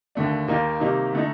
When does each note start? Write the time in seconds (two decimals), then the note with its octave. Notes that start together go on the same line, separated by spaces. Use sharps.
0.15 D#2 D3 A3 D4
0.48 D#2 D#3 A#3 D#4
0.80 C3 D#3 G3 A#3 D#4
1.13 D3 A3 D#4